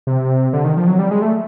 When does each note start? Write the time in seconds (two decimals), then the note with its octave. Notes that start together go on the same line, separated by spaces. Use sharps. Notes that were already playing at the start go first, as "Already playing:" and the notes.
0.07 C3
0.53 D3
0.64 D#3
0.77 F3
0.87 F#3
0.99 G3
1.11 G#3
1.22 A3